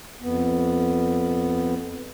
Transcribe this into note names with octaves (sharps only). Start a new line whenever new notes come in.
F2 B3